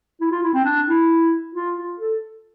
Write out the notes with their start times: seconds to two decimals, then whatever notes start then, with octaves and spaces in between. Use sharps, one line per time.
0.21 E4
0.32 F4
0.43 E4
0.54 C4
0.65 D4
0.87 E4
1.55 F4
1.77 F4
2.00 A4